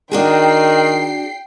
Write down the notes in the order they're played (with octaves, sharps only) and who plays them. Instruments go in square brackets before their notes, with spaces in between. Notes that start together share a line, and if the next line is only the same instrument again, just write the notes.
[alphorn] D#3 [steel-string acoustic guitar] D4 F#4 G#4 [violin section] G5 C7